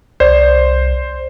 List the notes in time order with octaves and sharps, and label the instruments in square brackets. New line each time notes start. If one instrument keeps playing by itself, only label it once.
[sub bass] C2 [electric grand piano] C5 [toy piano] D5